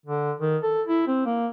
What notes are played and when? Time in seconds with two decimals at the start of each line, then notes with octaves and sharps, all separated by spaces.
0.06 D3
0.40 D#3
0.63 A4
0.87 E4
1.07 C4
1.26 A#3